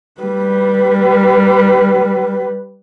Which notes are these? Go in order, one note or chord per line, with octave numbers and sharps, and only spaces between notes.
G3 B4